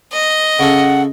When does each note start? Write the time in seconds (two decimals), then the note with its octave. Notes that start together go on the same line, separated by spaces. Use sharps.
0.13 D#5
0.59 C#3 C#4 A4 F#5